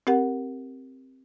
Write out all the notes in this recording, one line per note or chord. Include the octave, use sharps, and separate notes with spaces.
C4 G4 A#4 F#5